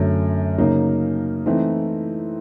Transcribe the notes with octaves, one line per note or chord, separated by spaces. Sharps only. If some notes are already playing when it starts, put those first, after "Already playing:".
Already playing: F#2 D3 F#3 A3
C#3 F#3 A#3 D#4
E3 A3 C4 D#4